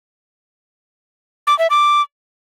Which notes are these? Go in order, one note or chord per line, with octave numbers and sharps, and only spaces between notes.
D6
E5
D6